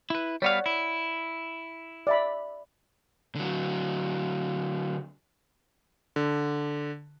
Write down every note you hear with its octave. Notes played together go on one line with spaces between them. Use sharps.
E4 B4
G3 B3 C#5 D5 F5 F#5
E4
D5 E5 B5
D3 F#3
D3